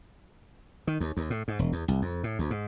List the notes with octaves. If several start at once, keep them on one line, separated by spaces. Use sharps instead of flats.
D#3
D#2
D#2
A2
G#2
E1
E2
C2
F2
A2
D2
G#2